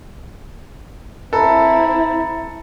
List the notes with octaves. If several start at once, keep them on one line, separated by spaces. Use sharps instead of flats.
C4 E4 A4 A#5 B5